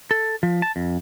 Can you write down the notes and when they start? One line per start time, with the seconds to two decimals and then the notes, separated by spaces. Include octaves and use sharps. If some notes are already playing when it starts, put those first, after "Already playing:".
0.11 A4
0.43 F3
0.62 A5
0.76 F2